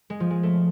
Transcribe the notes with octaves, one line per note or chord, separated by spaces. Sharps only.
G#3
F3
G#3
A3